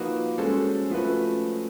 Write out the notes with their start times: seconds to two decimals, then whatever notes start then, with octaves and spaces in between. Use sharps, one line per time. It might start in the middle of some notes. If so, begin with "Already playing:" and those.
Already playing: F3 A#3 D#4 F#4 B4
0.38 G#3 C#4 F#4 A4 C5
0.90 F3 A3 C#4 F#4 B4